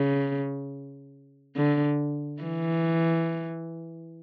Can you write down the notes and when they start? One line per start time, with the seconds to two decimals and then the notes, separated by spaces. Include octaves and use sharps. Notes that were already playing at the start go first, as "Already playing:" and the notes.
Already playing: C#3
1.56 D3
2.42 E3